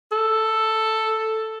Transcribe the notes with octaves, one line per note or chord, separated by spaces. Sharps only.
A4